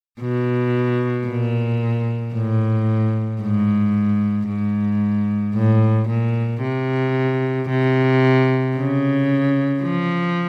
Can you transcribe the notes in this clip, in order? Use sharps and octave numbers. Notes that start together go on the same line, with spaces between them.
B2
A#2
A2
G#2
G#2
A2
A#2
C3
C3
C#3
F3